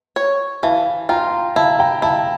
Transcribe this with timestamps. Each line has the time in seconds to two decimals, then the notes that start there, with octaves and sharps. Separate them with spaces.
0.16 C#5
0.63 E3 F5 A5
1.09 F4 G5 A#5
1.56 E4 F5 A5
1.79 G5 A#5
2.02 E4 F5 A5